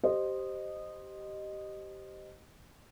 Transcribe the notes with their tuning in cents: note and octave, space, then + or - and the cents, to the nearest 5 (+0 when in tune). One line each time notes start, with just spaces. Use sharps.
G4 -15 C5 +0 D#5 -15